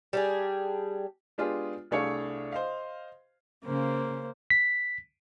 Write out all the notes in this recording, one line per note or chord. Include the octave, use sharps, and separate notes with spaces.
G3 D4 G#4
G#3 B3 D4 F4 G4 G#4
C2 A3 D4 G#4 C#5 F5
C5 D#5 F5
C#3 A#3 C5
B6